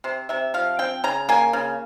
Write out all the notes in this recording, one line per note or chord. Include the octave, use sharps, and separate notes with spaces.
C3 C5
C3 E5
F3 F5
C4 G5
C#3 A#5
A#3 G#5
C#3